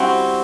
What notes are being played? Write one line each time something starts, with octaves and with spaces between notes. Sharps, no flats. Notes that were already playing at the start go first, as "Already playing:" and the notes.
Already playing: G3 C4 E4 F#4